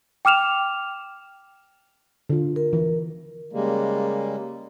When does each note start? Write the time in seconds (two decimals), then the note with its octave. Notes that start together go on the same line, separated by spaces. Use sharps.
0.25 G5 D6 F6 E7 F7
2.30 D3 F4
2.56 A#4
2.73 E3
3.53 C#3 G3 G#3 A#3